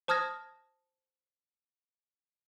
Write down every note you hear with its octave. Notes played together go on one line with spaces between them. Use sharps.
C5 A5 D#6 F6 G#6 A#6